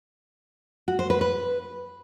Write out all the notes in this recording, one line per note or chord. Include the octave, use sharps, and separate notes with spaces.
F#4
C5
B4
B4